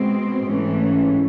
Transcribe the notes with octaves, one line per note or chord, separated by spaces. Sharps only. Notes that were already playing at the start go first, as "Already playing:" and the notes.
Already playing: B2 G#3 C4
G#2 E3 A3 C#4